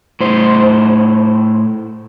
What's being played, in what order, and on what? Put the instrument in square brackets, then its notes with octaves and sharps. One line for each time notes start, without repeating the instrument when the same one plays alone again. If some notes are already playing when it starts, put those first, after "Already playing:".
[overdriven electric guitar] A2 C5